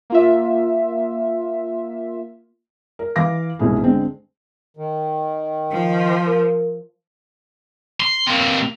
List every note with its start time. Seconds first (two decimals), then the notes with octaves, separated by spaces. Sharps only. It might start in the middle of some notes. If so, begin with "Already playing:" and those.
0.10 A#3 F4 E5
2.99 A#4
3.16 E3 F5 D6 A#6
3.59 E1 C2 G#2 A3 E4 G#4
3.84 D3 G#3 C4
4.77 D#3
5.71 F3
6.26 A#4
8.00 C6
8.27 C3 A#3